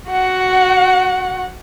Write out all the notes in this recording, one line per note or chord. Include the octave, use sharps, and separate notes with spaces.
F#4 F#5